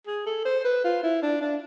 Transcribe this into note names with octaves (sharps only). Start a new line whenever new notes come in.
G#4
A4
C5
B4
F4
E4
D4
D4